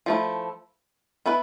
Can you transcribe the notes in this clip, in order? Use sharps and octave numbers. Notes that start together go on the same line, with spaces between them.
F3 A3 E4
B3 E4 B4